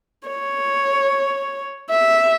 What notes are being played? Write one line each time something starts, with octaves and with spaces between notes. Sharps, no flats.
C#5
E5